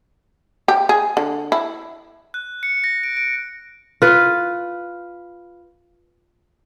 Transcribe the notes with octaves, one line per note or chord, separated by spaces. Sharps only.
G4
G#4
D3
E4
F#6
C#7
A#6
D7
D7
F4 B4